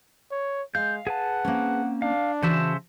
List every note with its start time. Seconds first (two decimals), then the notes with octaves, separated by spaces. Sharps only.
0.31 C#5
0.75 G#3 F5 G6
1.07 G#4 B4 F#5 A5
1.45 A#3 C4 C#4
2.02 D4 F5
2.42 C#3 E3 F#4 C5 E5 A5